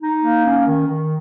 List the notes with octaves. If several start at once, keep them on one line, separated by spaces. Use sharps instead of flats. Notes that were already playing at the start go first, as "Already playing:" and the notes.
D#4
A#3
C#4
D#3
D#3